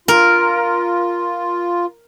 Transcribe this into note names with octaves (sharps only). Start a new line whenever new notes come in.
F4 A#4